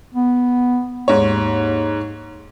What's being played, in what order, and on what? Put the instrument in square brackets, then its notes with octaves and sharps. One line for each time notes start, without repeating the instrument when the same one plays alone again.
[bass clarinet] B3
[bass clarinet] D#2 [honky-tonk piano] G#2 C#5